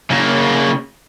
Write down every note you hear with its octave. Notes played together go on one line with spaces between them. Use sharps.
C#3 A#3